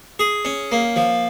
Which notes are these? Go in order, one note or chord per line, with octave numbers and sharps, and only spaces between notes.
G#4
C#4
A#3
F3